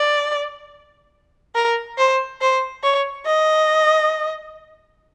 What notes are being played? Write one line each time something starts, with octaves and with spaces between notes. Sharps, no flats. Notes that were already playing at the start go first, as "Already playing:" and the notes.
Already playing: D5
A#4
C5
C5
C#5
D#5